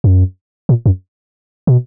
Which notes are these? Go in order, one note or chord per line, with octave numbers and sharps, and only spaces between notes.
F#2
A#2
F#2
B2